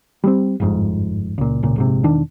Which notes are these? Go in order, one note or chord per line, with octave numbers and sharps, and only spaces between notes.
G3 G#3 C4
G1 F2 G#2
C#2 A#2
G#1 C#2 A#2
A#1 G#2 C3
E1 D#3 D4